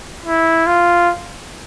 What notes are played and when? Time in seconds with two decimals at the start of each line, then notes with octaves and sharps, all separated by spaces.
0.25 E4
0.67 F4